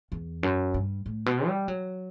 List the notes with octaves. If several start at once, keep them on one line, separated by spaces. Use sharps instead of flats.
E2
F#2
G2
A2
B2
G3
F#3